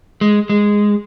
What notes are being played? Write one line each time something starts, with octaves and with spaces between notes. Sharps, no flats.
G#3
G#3